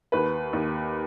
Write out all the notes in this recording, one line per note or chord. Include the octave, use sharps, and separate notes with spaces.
D#2 B4
D#2